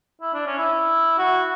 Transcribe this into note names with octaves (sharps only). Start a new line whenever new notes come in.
E4
D4
C#4
E4
F#4